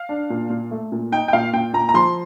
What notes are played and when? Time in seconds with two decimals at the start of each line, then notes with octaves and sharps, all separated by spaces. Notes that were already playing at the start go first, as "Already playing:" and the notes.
Already playing: F5
0.09 D4
0.30 A#2
0.50 A#2
0.71 A3
0.92 A#2
1.12 D#4 G5
1.28 G5
1.33 A#2 F5
1.53 A#2 G5
1.73 A#2 A#5
1.89 A#5
1.94 F3 C6